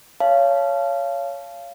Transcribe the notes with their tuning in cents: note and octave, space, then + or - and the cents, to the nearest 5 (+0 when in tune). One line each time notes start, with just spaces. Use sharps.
C#5 +15 F5 -20 A5 -25